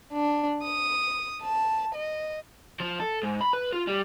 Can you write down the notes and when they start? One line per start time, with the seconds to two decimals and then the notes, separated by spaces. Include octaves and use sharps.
0.13 D4
0.64 D#6
1.42 A5
1.95 D#5
2.80 F3
2.99 A4
3.23 G#2
3.41 B5
3.53 B4
3.73 F4
3.88 G3